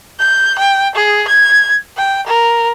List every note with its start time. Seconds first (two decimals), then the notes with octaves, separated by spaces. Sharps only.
0.19 G6
0.58 G5
0.95 G#4
1.27 G#6
1.97 G5
2.26 A#4